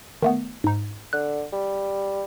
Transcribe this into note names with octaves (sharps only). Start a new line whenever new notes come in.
D#3 A3 B3
G#2 D#4
D3 F#6
G3